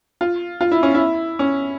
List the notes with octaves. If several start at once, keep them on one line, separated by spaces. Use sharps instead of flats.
F4
F4
E4
C#4
E4
C#4